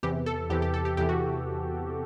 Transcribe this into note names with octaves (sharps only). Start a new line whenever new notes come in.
E2 C3 E3 G4
A4
E2 C3 E3 G4
G4
A4
G4
E2 C3 E3 G4
F#4